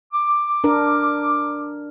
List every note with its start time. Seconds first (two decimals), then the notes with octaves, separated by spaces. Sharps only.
0.14 D6
0.64 D4 A#4